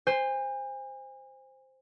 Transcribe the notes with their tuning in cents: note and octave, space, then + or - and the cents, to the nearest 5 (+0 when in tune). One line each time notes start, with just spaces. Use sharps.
C5 +0 G#5 -35